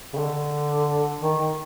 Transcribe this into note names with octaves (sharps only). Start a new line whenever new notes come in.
C#3
D3
D#3